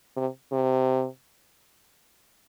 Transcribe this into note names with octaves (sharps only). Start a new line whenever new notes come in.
C3
C3